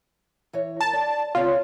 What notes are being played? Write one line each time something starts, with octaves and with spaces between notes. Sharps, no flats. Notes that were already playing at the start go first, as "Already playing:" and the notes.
E3 C#5
A#4 A5 A#5
D5
C#3 C4 F4 C#5